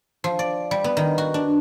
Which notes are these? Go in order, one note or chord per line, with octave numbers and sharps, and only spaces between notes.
F3
D5
G3
B3
D#3
F#4
D4